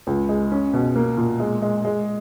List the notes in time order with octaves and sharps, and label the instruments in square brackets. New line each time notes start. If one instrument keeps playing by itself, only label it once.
[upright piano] C#2
G#3
C#4
B2
A#3
A#2
G#3
G#3
G#3